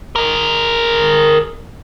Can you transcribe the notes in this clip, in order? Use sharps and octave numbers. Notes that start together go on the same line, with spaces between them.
G#4 A#4